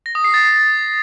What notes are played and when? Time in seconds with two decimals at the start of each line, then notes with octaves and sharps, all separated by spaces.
0.06 A#6
0.15 D#6
0.24 C7
0.34 A6